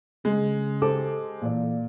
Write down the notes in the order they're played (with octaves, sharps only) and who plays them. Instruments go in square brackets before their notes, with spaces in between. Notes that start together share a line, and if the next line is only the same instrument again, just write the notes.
[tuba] C#3 [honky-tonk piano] G#3
[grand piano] G4 C5 D6 [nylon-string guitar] A4
[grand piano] A#2 D5 [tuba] E3